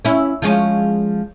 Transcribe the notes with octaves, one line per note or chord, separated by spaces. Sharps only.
C#4 E4
F3 G#3 C#4